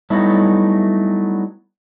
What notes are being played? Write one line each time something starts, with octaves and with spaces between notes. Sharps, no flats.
F#3 G3 A3 B3 D#4 E4